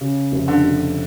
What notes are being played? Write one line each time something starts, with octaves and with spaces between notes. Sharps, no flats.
C#3
F1
D3
F1